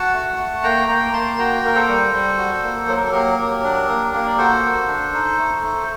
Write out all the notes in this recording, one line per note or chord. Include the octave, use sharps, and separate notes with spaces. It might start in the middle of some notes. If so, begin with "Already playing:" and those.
Already playing: F#4 F#5 A5
A3
A3
A#3 G5 A#5
A#3 G5 A#5
A#3 A5 C6
F#4 G5 A#5
A#3 A#4
A4 C5
G3
G3
F#4
A#3
F#3 C5
A#4
A4
A#3 G4 A#4
F#3
D4
A#3
A#3
D5
F#4 A4 C5
F#4
D4
D#4
A3
A3